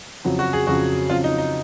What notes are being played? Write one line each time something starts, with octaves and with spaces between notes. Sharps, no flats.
F2 C#3 F#3
F#4
G#4
F2 C#3 F#3 F#4
F2 C#3 F#3 F4
D#4
D#4